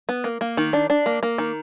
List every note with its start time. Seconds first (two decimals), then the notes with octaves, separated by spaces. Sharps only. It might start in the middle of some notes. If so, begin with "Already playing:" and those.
0.09 B3
0.24 A#3
0.41 A#3
0.57 D#3
0.73 D4
0.90 D4
1.06 A#3
1.23 A#3
1.38 D#3